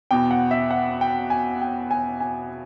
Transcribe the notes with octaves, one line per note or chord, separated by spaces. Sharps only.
E2 B2 G5
F#5
E5
F#5
G5
G#5
G5
G#5
G#5